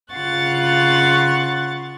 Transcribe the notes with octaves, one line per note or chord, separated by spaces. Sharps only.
C#3 F4 F#5 C#6 F#6 A6